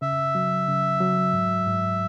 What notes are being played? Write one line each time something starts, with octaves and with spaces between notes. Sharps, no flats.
C#3 E5
F#3
C#3
F#3
G#2
G#2